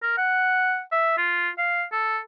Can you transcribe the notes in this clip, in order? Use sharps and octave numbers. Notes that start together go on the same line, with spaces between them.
A#4
F#5
E5
F4
F5
A4